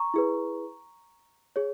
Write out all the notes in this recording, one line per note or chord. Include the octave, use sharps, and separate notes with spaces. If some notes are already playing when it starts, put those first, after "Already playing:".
Already playing: A#5 C#6
E4 G#4 B4
G#4 C#5